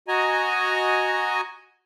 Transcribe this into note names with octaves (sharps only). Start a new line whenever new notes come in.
F#4 D#5 G#5 A#5